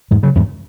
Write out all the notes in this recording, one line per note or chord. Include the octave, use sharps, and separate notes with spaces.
E2 G#2
C#3 F#3
E2 G#2